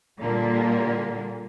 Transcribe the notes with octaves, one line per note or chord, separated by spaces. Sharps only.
A#2 D3 G3 A#3